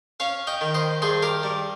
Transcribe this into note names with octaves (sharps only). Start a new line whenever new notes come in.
C#4 C#5 F5
D#5 G5
D#3
C5 D#5
G2 G#4 C5
G4 A#4
G3